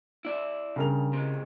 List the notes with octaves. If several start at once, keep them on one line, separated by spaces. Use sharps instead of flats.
E4 D5 E5
G2 C#3 A#4 F7
C3 G#3